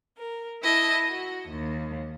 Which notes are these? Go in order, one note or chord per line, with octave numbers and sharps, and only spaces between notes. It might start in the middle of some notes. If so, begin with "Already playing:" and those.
A#4
E4 D#5 A5
F#4
D#2